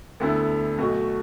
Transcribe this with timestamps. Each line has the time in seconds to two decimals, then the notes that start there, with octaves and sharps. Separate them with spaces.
0.20 D2 D3 B3 E4 A4
0.78 B1 B2 A3 F#4